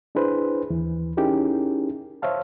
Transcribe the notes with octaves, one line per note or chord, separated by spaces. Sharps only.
D4 E4 G#4 B4 C5
D#2 E3
C#4 D#4 E4 G4 G#4 A#4
C5 C#5 E5 F5 A5